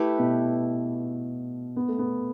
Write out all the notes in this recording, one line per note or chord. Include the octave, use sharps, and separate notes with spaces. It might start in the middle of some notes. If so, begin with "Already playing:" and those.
Already playing: A3 E4 G4 B4
B2
B3
A3
B3